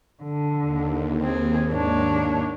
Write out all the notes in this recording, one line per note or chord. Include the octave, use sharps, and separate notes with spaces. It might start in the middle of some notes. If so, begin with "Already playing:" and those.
D3
D#2
C4 G#4
G#2 D4 C#5